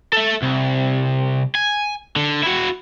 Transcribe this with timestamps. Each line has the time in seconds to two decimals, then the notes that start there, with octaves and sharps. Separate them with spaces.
0.13 A4 E5
0.42 C2
1.55 G#5
2.16 D3
2.43 E4 F#4